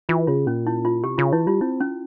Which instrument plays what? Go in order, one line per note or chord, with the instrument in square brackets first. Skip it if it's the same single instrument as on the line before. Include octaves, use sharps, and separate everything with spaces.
[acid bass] E3 [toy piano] F4
[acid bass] C#3 [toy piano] F4
[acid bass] A#2 [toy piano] C#4
[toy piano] E4
F4
[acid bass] C3 [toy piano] G4
[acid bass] C#3 [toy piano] F4
[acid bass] E3 [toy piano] E4
[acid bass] G3 [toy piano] F4
[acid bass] C4 [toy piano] E4
[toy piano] C#4